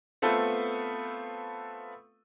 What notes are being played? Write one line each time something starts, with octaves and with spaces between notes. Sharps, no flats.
A3 B3 C4 F4 A4 B4